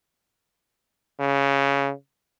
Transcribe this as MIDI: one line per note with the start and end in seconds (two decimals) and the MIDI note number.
1.20 1.92 49